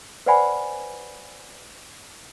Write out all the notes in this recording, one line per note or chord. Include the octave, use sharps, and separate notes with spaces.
B4 C5 D5 F#5 G#5 B5